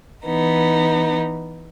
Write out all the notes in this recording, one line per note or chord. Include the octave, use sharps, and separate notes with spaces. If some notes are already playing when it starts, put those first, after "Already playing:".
E3 B3 D#4